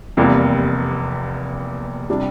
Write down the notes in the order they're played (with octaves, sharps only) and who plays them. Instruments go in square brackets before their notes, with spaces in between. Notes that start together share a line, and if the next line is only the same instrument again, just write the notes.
[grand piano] F1 E2 C3 G3 A#3
C3 G3 D4